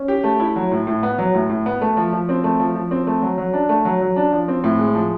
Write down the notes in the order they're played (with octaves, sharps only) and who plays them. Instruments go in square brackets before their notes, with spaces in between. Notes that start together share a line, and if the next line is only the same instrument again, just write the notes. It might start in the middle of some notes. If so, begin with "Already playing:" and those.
Already playing: [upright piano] C#4
G4
A3
E4
F#3
A2
A2
B3
F#3
A2
A2
B3
A3
F3
F3
C4
A3
F3
F3
C4
A3
F#3
F#3
D4
A3
F#3
F#3
D4
F3
C4
A2
G#3
F3